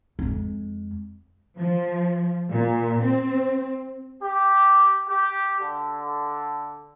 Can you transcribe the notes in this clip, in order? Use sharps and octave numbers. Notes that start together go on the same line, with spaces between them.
F2 G#3
F3
A#2
C4
G4
G4
D3